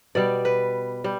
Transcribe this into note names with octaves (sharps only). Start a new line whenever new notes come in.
B2 G3 D5
B4
G3